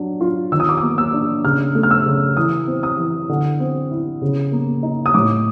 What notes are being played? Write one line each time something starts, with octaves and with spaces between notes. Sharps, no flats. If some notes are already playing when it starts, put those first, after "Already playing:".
Already playing: F#3 D4
F4
D#3 E6
D#6
D6
A#3 D#6
E6
D4
C#3 F6
A3
F6
E6
C#3
E3 D#6
C4
D#6
E3
D3
C4
E4
C#3
A#3
D#4
D#6
A2 D6